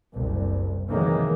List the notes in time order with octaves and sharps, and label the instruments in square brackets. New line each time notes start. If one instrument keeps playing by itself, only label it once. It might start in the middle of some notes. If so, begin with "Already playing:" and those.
[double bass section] F#1 C2
C3 D#3 E3 F#3 G#3 A#3